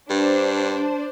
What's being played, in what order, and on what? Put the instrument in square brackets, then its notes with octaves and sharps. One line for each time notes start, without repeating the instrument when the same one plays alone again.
[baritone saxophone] G2 [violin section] D4 C5